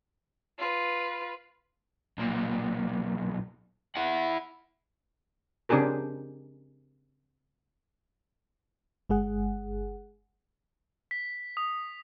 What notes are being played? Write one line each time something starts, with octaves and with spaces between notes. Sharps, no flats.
F4 B4
B1 A#2
E4 F#5
C#3 C4 D4 G4 G#4 A#4
G1 G#3 G#4 F#5
B6
D#6